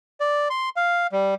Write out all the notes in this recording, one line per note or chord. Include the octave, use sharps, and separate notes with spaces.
D5
C6
F5
G3